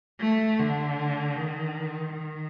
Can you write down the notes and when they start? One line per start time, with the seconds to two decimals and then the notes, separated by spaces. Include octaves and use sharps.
0.21 A3
0.59 D3
1.36 D#3
2.13 D#3